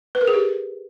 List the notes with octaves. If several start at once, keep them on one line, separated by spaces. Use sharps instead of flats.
B4
A#4
G#4
G4